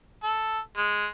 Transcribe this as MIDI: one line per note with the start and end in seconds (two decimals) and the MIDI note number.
0.23 0.60 69
0.77 1.06 56